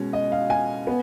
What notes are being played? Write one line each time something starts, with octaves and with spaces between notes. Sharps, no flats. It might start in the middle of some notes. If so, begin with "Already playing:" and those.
Already playing: B2 G#3 C#4
D#5
F5
G#5
B3